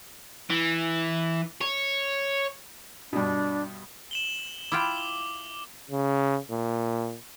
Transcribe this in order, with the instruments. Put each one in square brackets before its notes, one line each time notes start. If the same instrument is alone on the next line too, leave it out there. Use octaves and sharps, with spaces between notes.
[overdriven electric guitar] E3
C#5
[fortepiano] G2 B2 [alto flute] D4
[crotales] E7 F#7 G7
[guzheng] E4 F4 G5 [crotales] D6
[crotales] G7
[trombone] C#3
A#2